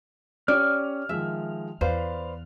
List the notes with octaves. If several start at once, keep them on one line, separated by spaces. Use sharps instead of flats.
C#4 G4 C#5 D5 F6
D#3 F3 G#3 E5
E2 B4 C5 D5 F5